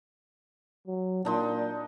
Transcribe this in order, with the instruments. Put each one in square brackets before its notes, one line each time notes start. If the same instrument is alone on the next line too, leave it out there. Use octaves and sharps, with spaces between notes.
[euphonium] F#3
[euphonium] A#2 [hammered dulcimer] D4 D#4 C6